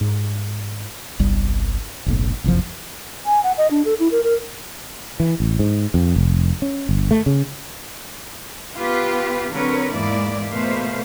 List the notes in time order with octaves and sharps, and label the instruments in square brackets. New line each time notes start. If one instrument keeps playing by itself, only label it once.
[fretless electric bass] G#2
G1 C2 G3
F#1 B1 A2
F#1 C2 F2 F3
[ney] G#5
F#5
D#5
D4
A4
E4
A#4
A#4
[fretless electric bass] E3
A1
G#2
F2
F1
C#4
G1
A3
C#3
[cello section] B3 F4 G4 B4
D3 F#3 C4 A#4 B4 C#5
E2 G#2 G#3 A#3 E4 D5
B2 A3 A#3 B4 C5 F5